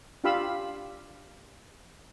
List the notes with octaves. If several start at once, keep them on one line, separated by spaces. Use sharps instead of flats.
D4 F4 G4 F5 B5 E6